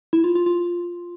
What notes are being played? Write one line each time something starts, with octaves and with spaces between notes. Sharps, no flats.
E4
F4
F4
F4